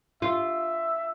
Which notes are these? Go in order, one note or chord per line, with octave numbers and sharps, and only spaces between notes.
F4 E5